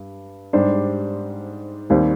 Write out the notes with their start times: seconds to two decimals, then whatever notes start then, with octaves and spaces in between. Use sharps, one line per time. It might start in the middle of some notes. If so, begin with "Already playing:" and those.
Already playing: G2
0.53 G#2 G3 D4 G4 C5
1.90 D#2 D#3 G3 C4